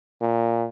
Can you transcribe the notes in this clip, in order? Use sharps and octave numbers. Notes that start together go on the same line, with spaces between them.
A#2